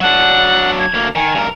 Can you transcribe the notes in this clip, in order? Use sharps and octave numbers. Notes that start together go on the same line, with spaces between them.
F#3 D4 F#5
G#6
D2 A#3
D#3 G#5
G2 A#4